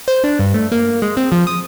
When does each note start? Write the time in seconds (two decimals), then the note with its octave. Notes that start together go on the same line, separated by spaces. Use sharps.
0.08 C5
0.24 D4
0.39 G2
0.54 A3
0.72 A#3
1.02 G#3
1.17 C4
1.32 F3
1.47 D#6